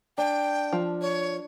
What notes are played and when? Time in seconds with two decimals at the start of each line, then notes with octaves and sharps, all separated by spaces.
0.18 D4 G5
0.73 F3
1.01 C#5